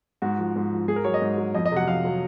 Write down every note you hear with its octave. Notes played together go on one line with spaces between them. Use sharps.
G#2 F#4
F3
G#2
F3
G#2 G#4
A#4
F#3 C#5
D#5
G#2
F#3
F2 D#5
D#5
C3 F#3 F#5
F2 F5
C3 F#3